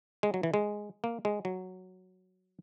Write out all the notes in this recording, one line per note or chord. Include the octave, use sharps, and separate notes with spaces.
G#3
F#3
E3
G#3
A#3
G#3
F#3